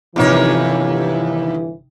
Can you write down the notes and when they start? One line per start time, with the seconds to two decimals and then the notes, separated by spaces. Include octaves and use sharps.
0.16 G1 D#2 C3 E3 F3 A#3 D#4 C#5